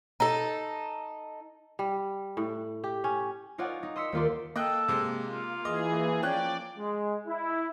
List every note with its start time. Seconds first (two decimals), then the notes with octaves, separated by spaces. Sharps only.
0.20 D#4 A4
1.79 G3
2.37 A2
2.84 G4
3.04 C#4
3.58 D#4 F4 C#5 D5 F#5 G#5
3.83 D#4
3.96 D#5 C6 E6 B6 C#7
4.12 D#2 A#3 F4 D5 C6
4.56 A#3 A4 D#5 G5 F#6
4.88 C3 G#3
5.29 F4
5.65 E3 G#4 D#5
6.22 F3 C#4 D5 G5 F#6
6.78 G#3
7.27 E4